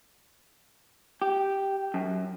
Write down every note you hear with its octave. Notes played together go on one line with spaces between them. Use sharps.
G4
F#2